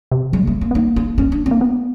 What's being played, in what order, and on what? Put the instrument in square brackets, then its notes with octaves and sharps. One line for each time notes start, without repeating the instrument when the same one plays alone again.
[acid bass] C3
[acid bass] F#3 [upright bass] G#3
[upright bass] A3 [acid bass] A#3
[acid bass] A3
[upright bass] A#3
[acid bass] B3
[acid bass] A#3 [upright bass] D#4
[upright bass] D#4
C#4
D4
C4
[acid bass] A#3
B3